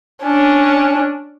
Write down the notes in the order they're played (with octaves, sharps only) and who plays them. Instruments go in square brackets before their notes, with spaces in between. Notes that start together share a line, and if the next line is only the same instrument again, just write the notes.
[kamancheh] C#4 D4